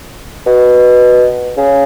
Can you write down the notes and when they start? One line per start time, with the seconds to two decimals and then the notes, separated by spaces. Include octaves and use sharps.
0.46 B2
1.57 C#3